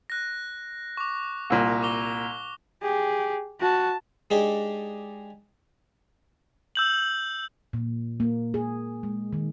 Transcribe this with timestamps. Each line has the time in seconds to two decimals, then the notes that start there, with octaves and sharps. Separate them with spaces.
0.10 F#6 A#6
0.97 C#6 D6
1.50 C2 A#2
1.82 C#6 D6 G7
2.82 G4 G#4
3.60 F#4 A5
4.30 G#3 D4 D#4 G4 G#4
6.75 E6 G6 F#7
7.73 A#2
8.20 A#3
8.54 G#4
9.03 G#3
9.33 D#3